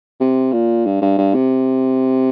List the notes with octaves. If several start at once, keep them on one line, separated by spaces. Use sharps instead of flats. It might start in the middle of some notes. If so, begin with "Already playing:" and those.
C3
A#2
G2
G2
G2
C3